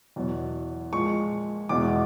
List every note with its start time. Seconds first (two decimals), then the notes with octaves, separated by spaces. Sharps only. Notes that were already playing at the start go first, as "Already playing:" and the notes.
0.16 E2 B2 F#3
0.93 A#2 F3 G#3 C#6
1.69 E2 B2 G#3 D6